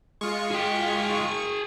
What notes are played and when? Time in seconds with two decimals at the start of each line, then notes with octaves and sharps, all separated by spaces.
0.21 G#3 F4 C#6
0.51 G#4 G5